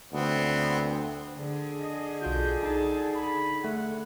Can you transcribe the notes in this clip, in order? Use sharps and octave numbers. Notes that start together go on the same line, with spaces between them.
D2 B3 C4
D3 G#4
D#5
B1 F4 F#4 G6
D#4 A5
B5
A3 F#5